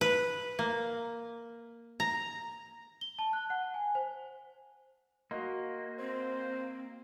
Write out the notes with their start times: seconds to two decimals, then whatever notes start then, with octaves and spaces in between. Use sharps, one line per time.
0.01 B4
0.59 A#3
2.00 A#5
3.01 G7
3.19 A5
3.33 F#6
3.50 F#5
3.74 G#5
3.95 C5
5.31 A#3 F#4 D#5 C6
5.99 C4 C5